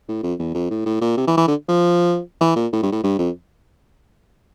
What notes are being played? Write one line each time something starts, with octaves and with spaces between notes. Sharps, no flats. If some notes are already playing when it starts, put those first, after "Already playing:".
A2
F2
E2
F2
A2
A2
A#2
C3
E3
E3
D3
F3
E3
A#2
A2
G2
A2
G2
F2